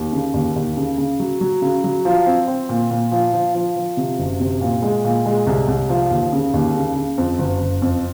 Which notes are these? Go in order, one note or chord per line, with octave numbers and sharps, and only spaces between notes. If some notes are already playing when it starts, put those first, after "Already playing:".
Already playing: D#2
C#3
D#2
D#2
C#3
C#3
F#3
F#3
C#3
F#3
F3
C4
C4
A#2
A#2
F3
F3
F3
F3
C3
F#1
C3
A#2
G#3
A#2
G#3
C2
C2
F3
D#2
C#3
D#2
C#3
C#3
F2
F#1
F#1
F2